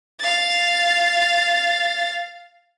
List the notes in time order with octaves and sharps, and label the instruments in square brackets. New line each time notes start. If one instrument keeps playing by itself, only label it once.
[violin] F5 A6